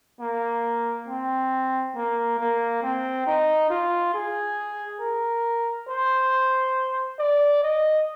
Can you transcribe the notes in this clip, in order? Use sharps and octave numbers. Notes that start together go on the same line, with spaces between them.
A#3
C4
A#3
A#3
C4
D#4
F4
G#4
A#4
C5
D5
D#5